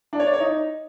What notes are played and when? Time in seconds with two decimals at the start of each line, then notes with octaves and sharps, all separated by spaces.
0.13 D4
0.20 C#5
0.26 D5
0.33 C#5
0.40 D#4